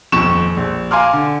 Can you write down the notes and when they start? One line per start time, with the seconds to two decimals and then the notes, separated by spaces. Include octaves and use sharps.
0.12 D#1 F2 C#6 E7
0.57 A#1
0.91 F5 G#5 A#5 C6 D6 F6
1.13 D3